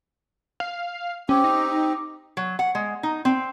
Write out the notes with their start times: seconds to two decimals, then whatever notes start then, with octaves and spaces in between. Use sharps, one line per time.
0.60 F5
1.29 C4 C#4 G4
1.44 D#4
2.37 F#3
2.59 F#5
2.75 G#3
3.03 D#4
3.25 C4